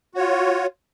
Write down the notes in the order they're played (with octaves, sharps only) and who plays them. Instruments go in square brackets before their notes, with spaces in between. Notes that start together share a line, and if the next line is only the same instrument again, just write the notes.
[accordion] F#4
C#5
F4